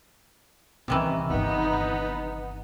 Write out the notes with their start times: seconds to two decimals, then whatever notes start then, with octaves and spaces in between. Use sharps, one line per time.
0.88 C2 C3 D#3 E3 C#4
1.30 D1 G1 B3 D#4